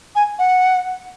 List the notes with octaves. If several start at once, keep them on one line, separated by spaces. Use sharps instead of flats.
G#5
F#5